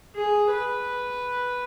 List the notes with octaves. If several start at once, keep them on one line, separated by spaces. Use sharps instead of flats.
G#4
B4